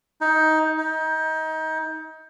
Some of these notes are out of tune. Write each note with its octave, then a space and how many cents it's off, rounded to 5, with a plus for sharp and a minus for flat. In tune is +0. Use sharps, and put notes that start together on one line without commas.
D#4 +15
D#4 +25